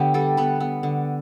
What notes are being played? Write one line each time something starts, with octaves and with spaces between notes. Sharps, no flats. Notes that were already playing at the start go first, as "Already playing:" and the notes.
Already playing: D3 B3 G4
G3 A4
B3 B4
B3
D3